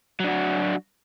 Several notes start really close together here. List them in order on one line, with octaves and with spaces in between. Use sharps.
F#3 D4 F#4